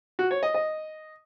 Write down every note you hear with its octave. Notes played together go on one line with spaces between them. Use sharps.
F#4
C#5
D#5
D#5